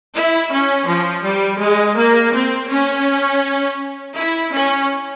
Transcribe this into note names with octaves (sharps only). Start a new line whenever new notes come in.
E4
C#4
F3
G3
G#3
A#3
C4
C#4
E4
C#4